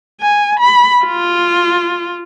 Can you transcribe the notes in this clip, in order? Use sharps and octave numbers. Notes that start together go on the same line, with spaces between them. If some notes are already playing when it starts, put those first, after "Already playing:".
G#5
B5
F4